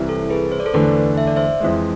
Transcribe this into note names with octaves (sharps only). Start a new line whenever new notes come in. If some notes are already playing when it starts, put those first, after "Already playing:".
Already playing: C2 C3 E3
A4
G#4 B4
C5
D5
A4 C5
E2 D3 A3 D4 B4 D5
E5
D5
C5 E5
F2 E3 G#3